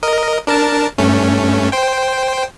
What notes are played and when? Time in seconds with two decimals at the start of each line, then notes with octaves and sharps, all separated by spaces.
0.03 A#4 D#5
0.47 D4 A#4 A5
0.98 G2 A3 C#4
1.72 C5 G5